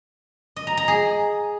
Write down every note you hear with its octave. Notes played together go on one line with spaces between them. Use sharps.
D#5
A#5
A#5
G#4